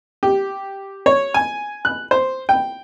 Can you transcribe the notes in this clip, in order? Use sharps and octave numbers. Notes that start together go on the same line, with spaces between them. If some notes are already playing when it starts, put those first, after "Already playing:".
G4
C#5
G#5
F#6
C5
G5